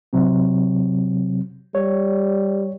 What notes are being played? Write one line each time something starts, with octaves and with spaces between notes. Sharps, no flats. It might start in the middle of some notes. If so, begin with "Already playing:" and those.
C3 F#3 C4
G3 C#5